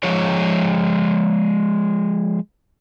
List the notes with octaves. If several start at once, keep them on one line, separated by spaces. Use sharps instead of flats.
F3 G#3 C#5